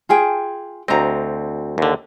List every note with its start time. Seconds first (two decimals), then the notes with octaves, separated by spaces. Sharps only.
0.09 F4 G#4 G5
0.88 D2 C4 D#5 A#5
1.78 D#2 D3